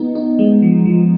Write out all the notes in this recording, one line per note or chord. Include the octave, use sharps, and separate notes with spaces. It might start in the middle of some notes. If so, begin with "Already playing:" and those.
Already playing: B3 D#4
D#4
G#3
F3
F3